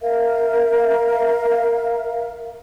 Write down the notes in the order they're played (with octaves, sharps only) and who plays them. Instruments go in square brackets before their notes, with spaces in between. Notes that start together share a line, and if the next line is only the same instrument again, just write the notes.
[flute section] A#4 E5 F5